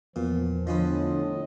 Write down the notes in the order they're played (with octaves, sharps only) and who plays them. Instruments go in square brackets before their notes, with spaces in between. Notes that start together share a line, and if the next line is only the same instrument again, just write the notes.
[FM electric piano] E2 B3 [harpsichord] A#2 [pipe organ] F3
[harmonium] A2 D#5 [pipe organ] D3 D4 F4 [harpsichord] F3 C#4 B4